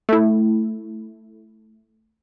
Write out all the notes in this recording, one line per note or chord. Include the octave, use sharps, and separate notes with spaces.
A3 E4